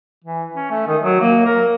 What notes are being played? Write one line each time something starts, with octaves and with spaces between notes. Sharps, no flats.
E3
C#4
A3
D#3
F#3
A#3
A#4